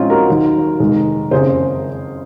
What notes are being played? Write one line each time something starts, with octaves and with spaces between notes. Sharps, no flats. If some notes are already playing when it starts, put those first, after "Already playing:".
Already playing: A#1 A#2 F3 G#3 C4 C#4 D#4 F4
F#4 A#4
D#2 D#3 F#3
F1 D#2 D#3 G#3
F#1 F2 C#3 G#4 C5